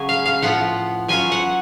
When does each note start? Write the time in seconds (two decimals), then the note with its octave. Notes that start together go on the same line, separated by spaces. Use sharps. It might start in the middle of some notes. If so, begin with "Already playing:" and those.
Already playing: C#3 F#3 C#4 G#5
0.09 F5
0.26 F5
0.42 A2 F3 B3 F4 F#5
1.08 F#3 C#4 F4 G#5
1.32 F#5